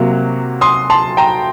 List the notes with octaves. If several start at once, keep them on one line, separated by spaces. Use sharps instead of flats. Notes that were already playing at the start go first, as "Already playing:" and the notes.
Already playing: C3 F#3 A#3
C6 D#6
A5 C6
G5 A#5